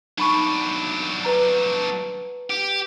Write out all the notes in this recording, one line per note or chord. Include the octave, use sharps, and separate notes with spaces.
F#3 D4 D#4 B5 C#6
B4 A#5
G4